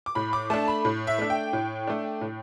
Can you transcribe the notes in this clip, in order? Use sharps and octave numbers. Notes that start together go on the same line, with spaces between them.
D6
A2 B5
D6
A3 D4 A5
B5
A2
E5
A3 D4
G5
A2
A3 D4
A2